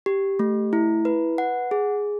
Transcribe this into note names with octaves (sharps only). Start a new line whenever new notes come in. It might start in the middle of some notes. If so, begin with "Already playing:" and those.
G4
A3
E4
B4
F#5
G#4